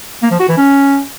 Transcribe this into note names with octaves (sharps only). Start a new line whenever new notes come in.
A#3
F3
F#4
E3
C#4